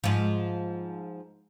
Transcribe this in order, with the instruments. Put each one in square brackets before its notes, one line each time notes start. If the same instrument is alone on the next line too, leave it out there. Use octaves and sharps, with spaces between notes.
[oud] G#2 F3